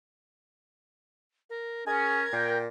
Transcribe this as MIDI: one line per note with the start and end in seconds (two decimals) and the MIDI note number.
1.50 1.87 70
1.87 2.24 61
1.87 2.19 68
1.87 2.58 70
1.87 2.50 92
2.33 2.68 46
2.33 2.56 79